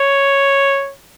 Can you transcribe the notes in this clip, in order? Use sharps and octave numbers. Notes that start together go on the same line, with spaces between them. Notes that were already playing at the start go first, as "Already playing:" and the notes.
Already playing: C#5